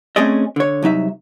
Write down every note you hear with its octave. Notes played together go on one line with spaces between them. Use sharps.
A3 C4 C#4 G#4 D5 D#5
D3 C#5
C2 F#3 D#4 E5